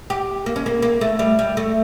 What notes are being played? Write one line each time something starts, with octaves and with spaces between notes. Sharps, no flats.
G4
A#3
C#4
A#3
A#3
A3
G3
G3
A3